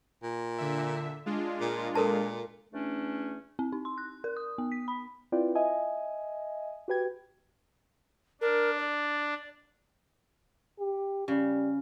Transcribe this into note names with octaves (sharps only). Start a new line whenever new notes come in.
A#2
D3 E5
G#3 D4 F4
A#2
A#2 A4 A#4 A5
E2 A3 C#4 D4
C4
D#4
C6
F#6
A#4
D#6
B3
B6
B5
C4 E4 F4 B4 D5 G5
D#5 E5 G#5
F#4 G4 B4 G5 G#6
D4 A#4
D5
G4
C#3 G3